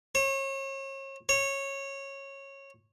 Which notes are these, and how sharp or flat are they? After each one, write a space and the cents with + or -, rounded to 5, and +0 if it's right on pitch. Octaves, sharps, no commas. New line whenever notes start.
C#5 -35
C#5 -15